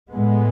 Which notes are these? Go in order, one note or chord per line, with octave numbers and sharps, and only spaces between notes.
A2 G#3 B3